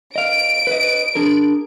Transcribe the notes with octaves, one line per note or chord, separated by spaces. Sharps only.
D#5 F5 D7
B4 D#5
D4 G#4 A#4